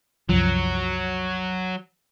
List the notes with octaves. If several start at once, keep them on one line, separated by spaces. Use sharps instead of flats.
C2 F#2 F3 F#3